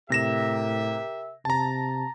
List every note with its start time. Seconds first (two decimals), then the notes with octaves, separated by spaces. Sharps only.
0.10 A2 C3 G4 A#4 E5 A#6 E7
1.45 C3 A5 A#5